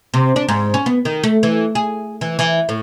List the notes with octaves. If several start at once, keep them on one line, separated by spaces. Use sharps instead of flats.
C3
D4
G#2
C#4
B3
D#3
A3
E3
G#4
E3
E3
A2